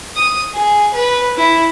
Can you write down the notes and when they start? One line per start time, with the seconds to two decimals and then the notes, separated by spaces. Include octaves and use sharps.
0.16 D#6
0.53 G#4
0.94 B4
1.37 E4